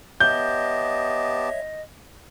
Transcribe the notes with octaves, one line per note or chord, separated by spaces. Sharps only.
B3 G4 C#5 D#5 E5 A5 G6